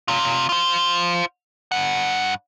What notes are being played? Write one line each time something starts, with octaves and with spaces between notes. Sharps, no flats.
C3 F4
F4 C5
G2 F#5